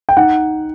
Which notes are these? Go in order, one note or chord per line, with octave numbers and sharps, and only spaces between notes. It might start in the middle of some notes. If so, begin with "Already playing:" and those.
G5
D#4 F#5